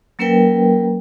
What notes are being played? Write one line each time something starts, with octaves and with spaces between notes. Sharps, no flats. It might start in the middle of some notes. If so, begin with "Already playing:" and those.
F#3 A#3 C#4 A#4 B4 G5